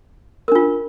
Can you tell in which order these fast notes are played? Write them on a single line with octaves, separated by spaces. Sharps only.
A#4 D4 F4